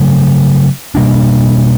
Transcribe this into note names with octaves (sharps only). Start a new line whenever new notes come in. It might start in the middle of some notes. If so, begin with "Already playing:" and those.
Already playing: C#3 F#3 A3
B2 G3 A#3 D4